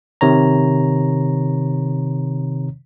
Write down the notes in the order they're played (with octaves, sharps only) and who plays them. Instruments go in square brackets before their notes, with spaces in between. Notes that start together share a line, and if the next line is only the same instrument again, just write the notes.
[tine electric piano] C3 D#3 C#5 A#5